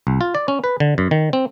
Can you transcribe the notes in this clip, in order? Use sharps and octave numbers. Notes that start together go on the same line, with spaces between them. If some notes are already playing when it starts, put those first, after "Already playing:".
C2
F4
D5
C#4
B4
D3
F#2
D#3
C4